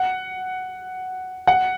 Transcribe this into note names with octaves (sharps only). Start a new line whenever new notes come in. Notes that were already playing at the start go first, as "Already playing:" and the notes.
Already playing: F#5
F#5